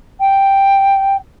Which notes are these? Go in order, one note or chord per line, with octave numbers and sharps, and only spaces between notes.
G5